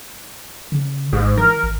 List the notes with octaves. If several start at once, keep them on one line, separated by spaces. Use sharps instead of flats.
C#3
G#1 G#2
E3 A#4
G#1